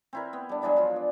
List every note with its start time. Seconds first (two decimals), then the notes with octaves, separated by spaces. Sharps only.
0.13 C4 E4 A#4
0.33 B3
0.49 G3 D4
0.62 F#3 G#3 D4 E4
0.76 F3 F4
0.96 D5